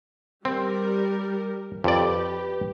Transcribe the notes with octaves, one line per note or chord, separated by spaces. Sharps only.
G3 C4 A#4
F2 G4 B4 D5